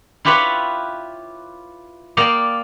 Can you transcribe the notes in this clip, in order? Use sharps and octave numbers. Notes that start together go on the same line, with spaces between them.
E4 F4 G4 B4 C#5
A#3 D5 D#5 F5 G5